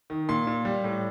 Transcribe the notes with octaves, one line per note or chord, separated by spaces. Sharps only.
D#3
A#2 C6
A#2
G3
A2